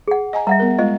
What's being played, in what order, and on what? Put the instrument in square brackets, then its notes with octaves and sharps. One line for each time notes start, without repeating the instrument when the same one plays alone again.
[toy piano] G#4 F#5
[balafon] D#5 G#5 A#5
[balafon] G3 [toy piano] E5 F#5 A#5
[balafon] B3 A#4
[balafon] G#3 F4 [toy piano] D#5